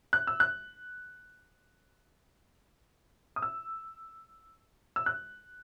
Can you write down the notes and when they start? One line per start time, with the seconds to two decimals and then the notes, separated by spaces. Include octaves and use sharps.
0.13 F#6
0.27 E6
0.40 F#6
3.36 D#6
3.42 E6
4.96 E6
5.06 F#6